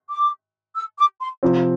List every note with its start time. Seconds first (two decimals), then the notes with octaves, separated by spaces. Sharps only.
0.09 D6
0.76 E6
0.98 D6
1.20 C6
1.43 C3 F3 C4